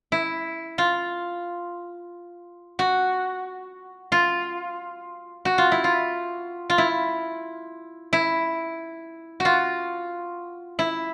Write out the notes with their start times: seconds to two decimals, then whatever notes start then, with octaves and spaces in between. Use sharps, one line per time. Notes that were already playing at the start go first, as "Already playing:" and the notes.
0.12 E4
0.78 F4
2.79 F#4
4.12 F4
5.45 F#4
5.58 F4
5.72 E4
5.84 F4
6.70 F4
6.78 E4
8.13 E4
9.40 F#4
9.45 F4
10.79 E4